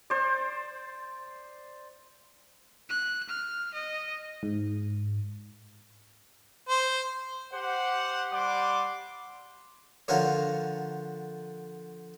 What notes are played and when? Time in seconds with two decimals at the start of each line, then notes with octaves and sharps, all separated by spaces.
0.10 C5 D5
2.90 F#6
3.29 F6
3.74 D#5
4.43 G#2
6.69 C5
7.53 G4 C5 F#5
8.32 G3 F#5 C6 D6
10.08 D3 F3 F4 F#4 A#4 C#5